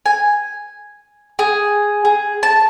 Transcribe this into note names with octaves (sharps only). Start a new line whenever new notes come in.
G#5
G#4
G#4
A5